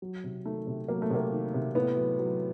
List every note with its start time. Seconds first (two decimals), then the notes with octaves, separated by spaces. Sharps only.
0.02 F#3
0.24 C3
0.45 D#3 A3
0.67 C3
0.88 F#3 A#3
1.02 A3
1.10 C3 A#3
1.32 D#3
1.54 C3
1.75 A2 B3
1.97 F#3
2.19 F#3